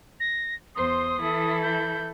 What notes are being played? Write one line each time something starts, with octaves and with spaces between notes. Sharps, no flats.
A#6
E2 C5 C6 D#6
E3 E4 A4
G6